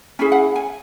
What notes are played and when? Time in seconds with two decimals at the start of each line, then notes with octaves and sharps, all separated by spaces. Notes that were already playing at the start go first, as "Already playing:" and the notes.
0.19 C#4 E4 G#4 G#5
0.32 F#5
0.56 G#5